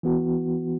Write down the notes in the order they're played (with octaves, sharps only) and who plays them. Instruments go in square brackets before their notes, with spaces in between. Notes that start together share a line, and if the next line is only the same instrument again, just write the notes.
[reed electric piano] E3 B3 F#4